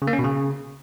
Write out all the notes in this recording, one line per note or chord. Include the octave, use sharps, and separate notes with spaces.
C#3
A#3
C#4
B2
C#3